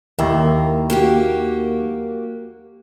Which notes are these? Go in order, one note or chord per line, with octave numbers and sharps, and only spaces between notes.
D#2 D#3 A#3 E4
A#3 F#4 G4